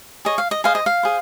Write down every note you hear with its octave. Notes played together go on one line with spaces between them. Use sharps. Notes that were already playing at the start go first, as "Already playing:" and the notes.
G#4 C#5 D#5
F5
D#5
G#4 C5 D#5 F5
D#5
F5
G#4 C5